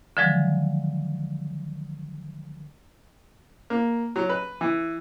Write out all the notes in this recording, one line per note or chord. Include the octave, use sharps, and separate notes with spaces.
D3 D#3 F3 F#3 G#3
A#3
F#3
B4
E3